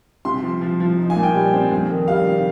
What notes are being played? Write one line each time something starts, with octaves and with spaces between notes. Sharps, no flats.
C3 C6
F3
F3
F3
D#4
G#5
A#2
G5
G3
C4
F2
D#3
G3 F5
C3